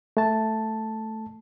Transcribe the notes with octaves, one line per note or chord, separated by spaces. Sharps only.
A3 A5